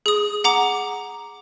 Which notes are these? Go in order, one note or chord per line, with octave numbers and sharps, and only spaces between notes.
G#4 D#6
F#5 A#5 D6